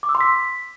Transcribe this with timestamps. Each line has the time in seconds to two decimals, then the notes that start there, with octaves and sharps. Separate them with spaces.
0.03 D6
0.09 E6
0.15 C6
0.21 B6